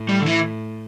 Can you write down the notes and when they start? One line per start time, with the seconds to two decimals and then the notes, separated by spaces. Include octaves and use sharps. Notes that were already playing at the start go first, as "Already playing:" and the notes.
Already playing: A2
0.09 G3
0.21 D3
0.26 E3